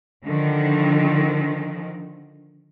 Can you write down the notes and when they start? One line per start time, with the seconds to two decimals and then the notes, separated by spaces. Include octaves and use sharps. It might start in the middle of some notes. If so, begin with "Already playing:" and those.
0.24 D3 D#3 F3